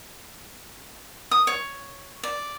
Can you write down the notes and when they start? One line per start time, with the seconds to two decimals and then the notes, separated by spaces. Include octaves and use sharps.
1.31 D#6
1.47 C#5
2.23 D5